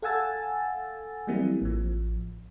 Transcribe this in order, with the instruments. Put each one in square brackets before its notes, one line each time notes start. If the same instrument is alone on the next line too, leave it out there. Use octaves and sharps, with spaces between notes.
[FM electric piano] A4 F5 F#5 G#5 E6 A6
E3 F#3 G3 A#3 C4 E4
A1 F3